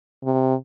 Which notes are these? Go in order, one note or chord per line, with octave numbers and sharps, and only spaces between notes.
C3